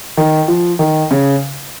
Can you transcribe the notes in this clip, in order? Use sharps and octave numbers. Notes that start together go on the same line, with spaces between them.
D#3
F3
D#3
C#3